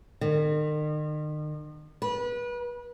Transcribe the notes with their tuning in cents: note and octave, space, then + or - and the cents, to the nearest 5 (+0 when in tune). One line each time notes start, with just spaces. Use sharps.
D#3 -40
B4 -30